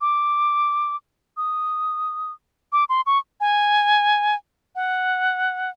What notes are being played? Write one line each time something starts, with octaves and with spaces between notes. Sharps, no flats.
D6
D#6
D6
C6
C#6
G#5
F#5